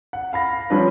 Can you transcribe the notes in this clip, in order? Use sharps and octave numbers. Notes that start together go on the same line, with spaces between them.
F#5
F5 B5 A#6
F3 G3 C#4 D4 B4